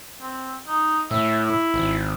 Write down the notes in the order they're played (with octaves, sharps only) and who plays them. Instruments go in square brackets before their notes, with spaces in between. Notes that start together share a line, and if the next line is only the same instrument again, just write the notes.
[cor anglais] C4
D#4
[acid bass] A2 [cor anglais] E5
[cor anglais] E4
[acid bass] G#1